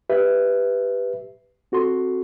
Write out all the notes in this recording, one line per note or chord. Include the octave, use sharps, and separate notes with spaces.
G4 B4 E5
C4 F#4 A4 C6